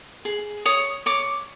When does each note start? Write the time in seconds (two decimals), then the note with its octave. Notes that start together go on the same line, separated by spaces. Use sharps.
0.25 G#4
0.66 C#5 D#6
1.06 C#5 D6